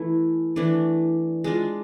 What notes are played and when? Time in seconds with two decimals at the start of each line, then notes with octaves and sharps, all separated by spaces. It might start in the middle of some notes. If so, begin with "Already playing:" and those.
Already playing: E3 A3 E4
0.56 E3 A3 D4
1.44 G#3 D4 F4